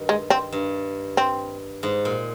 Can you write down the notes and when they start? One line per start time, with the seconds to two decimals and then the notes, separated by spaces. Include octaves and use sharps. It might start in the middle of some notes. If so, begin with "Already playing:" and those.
Already playing: G2 D#3
0.09 G#3
0.30 C4
0.52 G2
1.17 C4
1.83 G#2
2.05 A#2